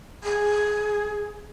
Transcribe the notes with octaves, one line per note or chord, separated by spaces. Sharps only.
G#4